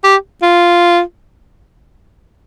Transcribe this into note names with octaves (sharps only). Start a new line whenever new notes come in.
G4
F4